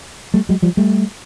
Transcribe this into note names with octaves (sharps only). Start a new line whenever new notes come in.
G3 A3
F#3 G#3
F3 G3
G3 A3